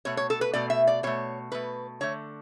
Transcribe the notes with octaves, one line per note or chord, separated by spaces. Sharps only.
B2 A3 C#5
C#5
A4
B4
B2 A3 D5
E5
D5
B2 A3 C#5
B2 A3 B4
D3 A3 C#5